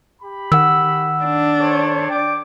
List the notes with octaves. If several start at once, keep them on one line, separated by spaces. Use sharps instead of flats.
G4 B5
D#3 F#5 E6
D4
A4 C5 C#5
D5 G5 D6